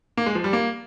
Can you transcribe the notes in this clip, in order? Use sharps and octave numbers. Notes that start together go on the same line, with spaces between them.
A#3
G#3
F3
G3
A#3